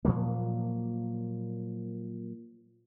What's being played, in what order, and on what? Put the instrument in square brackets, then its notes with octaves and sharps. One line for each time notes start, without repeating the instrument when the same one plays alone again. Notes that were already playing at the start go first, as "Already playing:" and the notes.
[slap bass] A#2 F3 F#3 A#3